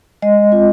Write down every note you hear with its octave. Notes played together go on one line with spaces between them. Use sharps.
G#3 D#5
C4 F4